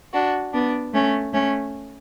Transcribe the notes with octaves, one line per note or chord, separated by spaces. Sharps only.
D4 F#4
B3 D4
A3 C#4
A3 C#4